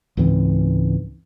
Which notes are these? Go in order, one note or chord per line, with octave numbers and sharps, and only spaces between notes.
C#2 G#2 E3 C4